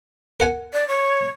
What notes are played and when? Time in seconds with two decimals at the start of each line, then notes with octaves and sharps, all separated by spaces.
0.40 A#4 F#5 G#5
0.73 D5
0.88 C#5